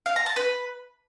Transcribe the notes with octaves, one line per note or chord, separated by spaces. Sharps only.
F5
A#5
A5
B4